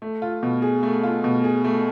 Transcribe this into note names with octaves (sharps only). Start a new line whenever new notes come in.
A3
F4
B2
G#4
A3
F4
B2
G#4
A3